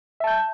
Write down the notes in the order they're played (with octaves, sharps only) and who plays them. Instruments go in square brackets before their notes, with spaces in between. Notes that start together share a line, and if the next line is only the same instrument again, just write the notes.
[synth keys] E5
A5
G6